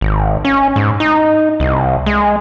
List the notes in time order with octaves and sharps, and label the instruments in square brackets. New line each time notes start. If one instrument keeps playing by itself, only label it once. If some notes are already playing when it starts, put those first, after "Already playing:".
[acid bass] G#1
C#4
G#2
D#4
C2
G#3